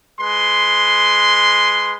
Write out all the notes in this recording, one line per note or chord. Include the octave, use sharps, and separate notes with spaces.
G#3 B4 C6